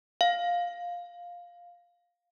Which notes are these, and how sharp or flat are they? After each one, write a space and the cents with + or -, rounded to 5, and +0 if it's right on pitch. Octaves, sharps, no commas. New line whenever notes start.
F5 +5